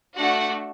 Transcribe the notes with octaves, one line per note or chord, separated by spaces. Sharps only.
A3 D4 F#4 F#5